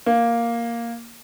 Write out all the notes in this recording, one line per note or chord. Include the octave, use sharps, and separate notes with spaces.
A#3